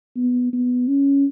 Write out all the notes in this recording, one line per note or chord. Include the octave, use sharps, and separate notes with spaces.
B3
B3
C#4